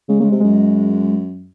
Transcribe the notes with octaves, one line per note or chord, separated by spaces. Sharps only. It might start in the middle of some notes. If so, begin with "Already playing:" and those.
C#3 G#3
C#3 G#3 A#3
C3
F#2 G#3